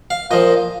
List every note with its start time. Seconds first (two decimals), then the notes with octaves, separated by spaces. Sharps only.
0.10 F5
0.31 A#2 F3 D#5